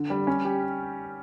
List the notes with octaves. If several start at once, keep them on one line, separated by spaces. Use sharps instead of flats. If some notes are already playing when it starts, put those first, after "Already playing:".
Already playing: D3
G3
C#4
G4